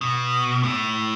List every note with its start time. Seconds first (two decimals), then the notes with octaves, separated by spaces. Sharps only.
0.01 B2
0.63 A2